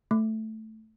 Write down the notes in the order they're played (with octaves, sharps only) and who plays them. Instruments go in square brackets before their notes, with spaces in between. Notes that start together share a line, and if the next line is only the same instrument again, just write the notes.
[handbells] A3